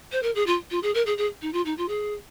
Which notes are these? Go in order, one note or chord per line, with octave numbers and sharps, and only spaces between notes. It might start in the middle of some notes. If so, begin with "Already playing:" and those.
C5
A#4
G#4
F4
F4
G#4
A#4
G#4
G#4
D#4
F4
D#4
F4
G#4